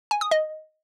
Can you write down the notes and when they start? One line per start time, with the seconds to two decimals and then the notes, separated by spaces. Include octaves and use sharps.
0.11 G#5
0.21 D#6
0.31 D#5